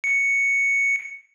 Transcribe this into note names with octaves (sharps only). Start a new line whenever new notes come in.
C#7